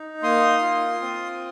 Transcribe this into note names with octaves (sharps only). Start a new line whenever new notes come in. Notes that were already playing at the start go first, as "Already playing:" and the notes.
Already playing: D#4
A#3 C6 D#6
F4
C4